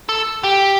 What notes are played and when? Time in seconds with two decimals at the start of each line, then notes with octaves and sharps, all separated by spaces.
0.09 A4
0.44 G4